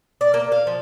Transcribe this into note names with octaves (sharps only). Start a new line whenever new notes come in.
D5
A#3
F5
F3